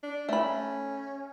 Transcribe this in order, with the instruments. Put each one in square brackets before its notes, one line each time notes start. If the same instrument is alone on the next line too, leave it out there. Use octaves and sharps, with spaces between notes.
[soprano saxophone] D4
[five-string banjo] A3 B5 [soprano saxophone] C#4